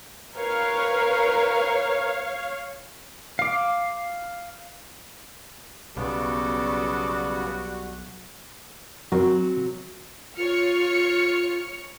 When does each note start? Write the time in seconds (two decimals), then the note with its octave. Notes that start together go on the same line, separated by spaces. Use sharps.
0.37 A#4 B4 C#5 F5
3.39 F5 D6
5.97 B1 C#3 G3 B3 F#4 A4 D5
9.12 F#3 C4 F#4 A#4 C#5
10.37 F4 C#5 F6 C#7